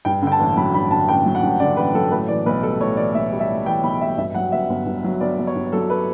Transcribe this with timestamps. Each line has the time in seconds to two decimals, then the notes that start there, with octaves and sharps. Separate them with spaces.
0.05 G2 G5
0.22 D3 G5
0.32 A5
0.39 A1
0.57 F#3 B5
0.74 G2 B5
0.91 D3 A5
1.08 A1 G5
1.26 F#3
1.35 F#5
1.42 G2
1.60 D3 D5
1.77 A1 B4
1.94 F#3 A4
2.11 A2 B4
2.28 E3 D5
2.46 B1 B4
2.63 G3 A4
2.80 A2 C#5
2.97 E3 D5
3.14 B1 E5
3.32 G3
3.40 E5
3.49 A2
3.66 E3 G5
3.83 B1 B5
4.00 G3 E5
4.18 G2 E5
4.35 F#3 F#5
4.52 G1 E5
4.70 G1
4.86 G2
5.04 F#3
5.20 G1 D5
5.38 G1
5.47 C#5
5.56 G2
5.73 F#3 A4
5.90 B4